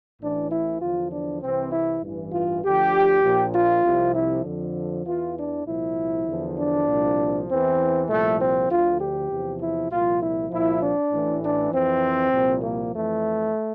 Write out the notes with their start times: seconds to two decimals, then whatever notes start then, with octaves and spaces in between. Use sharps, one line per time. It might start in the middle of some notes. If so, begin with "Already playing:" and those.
0.20 A1 A2 E3 D4
0.51 E4
0.80 E2 D3 F3 F4
1.11 D4
1.41 C2 C3 E3 C4
1.71 E4
2.02 A1 G2 E3
2.32 F4
2.63 D2 D3 F3 G4
3.23 A#1 A#2 F3
3.54 F4
3.84 C2 C3 F3
4.14 E4
4.44 F2 D3 F3
5.05 E2 E3 F4
5.36 D4
5.66 C2 A#2 F3 E4
6.26 E2 D3 F3
6.57 D4
6.87 C2 A#2 F3
7.48 E2 E3 C4
8.08 C2 A#2 F3 A3
8.39 C4
8.69 D2 D3 F3 F4
8.99 G4
9.30 E2 C3 F3
9.59 E4
9.90 C2 A#2 F3 F4
10.20 E4
10.50 C2 A#2 F3 E4
10.81 D4
11.11 A1 A2 E3
11.41 D4
11.72 F2 E3 C4
12.32 C2 A#2 F3
12.62 A#3
12.92 F2 E3 A3